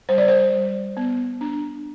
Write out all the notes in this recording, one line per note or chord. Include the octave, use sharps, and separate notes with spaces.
G3 C5
D5
C5
G3
B3
D4